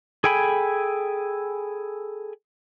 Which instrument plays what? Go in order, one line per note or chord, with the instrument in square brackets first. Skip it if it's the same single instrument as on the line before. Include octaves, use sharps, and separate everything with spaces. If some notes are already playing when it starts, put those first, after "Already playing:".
[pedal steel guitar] G#4 A4 G5 G#5 B5